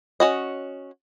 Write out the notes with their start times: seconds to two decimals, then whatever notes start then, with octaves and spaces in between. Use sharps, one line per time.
0.20 C#4 F#4 D#5